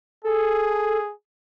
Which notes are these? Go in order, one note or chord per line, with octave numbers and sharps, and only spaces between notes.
G#4 A4